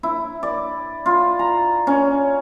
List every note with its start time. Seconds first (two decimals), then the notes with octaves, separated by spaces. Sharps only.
0.03 E4
0.43 D5
1.06 F4
1.39 A#5
1.87 C#4